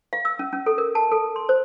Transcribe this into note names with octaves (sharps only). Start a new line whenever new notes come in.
F5
E6
C#4
C#4
A4
A#4
A5
A4
C6
C5